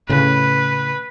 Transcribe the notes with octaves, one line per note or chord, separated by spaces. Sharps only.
A2 C#3 B4